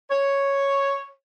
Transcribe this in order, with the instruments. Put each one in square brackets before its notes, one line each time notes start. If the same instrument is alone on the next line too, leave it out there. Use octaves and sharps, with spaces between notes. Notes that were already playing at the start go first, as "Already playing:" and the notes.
[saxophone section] C#5